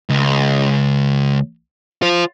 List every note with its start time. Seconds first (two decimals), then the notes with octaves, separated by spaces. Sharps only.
0.10 C#2
2.02 F4 C5